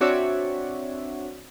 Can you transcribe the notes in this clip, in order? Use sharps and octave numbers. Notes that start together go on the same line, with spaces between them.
C4 D4 F#4 C#5 D5 E5